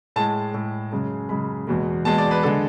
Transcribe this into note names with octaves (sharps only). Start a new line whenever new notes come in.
A2 G#3 A5
A2 G#3
F#2 C#3 G#3
F#2 C#3 G#3 B5
E2 B2 G#3
E2 B2 G#3 A5
D5
B4
D3 G#3 A4